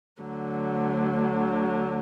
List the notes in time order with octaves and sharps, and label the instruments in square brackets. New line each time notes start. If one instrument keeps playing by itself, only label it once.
[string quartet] D2 D3 F#3